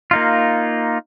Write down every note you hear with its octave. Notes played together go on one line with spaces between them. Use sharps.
A#3 D#4 F4